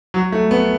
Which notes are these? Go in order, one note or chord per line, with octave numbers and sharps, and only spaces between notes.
F#3
A3
B3